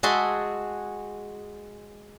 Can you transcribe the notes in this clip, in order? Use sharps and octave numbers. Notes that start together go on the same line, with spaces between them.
G#3 F#4 G#4 E5 A5 C6